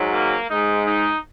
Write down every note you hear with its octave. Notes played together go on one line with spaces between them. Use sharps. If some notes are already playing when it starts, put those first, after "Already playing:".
Already playing: G#2 F#3
A#3
G#2 G#3 D#4
D#4